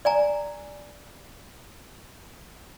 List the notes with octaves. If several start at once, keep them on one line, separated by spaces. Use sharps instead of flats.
D5 G#5 A#5